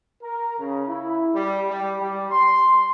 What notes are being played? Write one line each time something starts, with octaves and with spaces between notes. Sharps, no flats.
A#4
C#3
E4
G3
G3
G3
C6